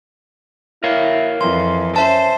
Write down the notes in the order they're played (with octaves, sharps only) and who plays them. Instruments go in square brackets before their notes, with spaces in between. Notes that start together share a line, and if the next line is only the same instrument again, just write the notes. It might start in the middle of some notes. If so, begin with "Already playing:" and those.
[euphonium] E4 [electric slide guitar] A#4 C#5 F5
[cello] F2 [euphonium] E3 [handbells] C6
[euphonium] C#4 [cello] C5 [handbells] E5 A5